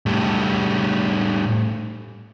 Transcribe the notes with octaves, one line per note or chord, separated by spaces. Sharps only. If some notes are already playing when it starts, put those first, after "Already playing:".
A2 G3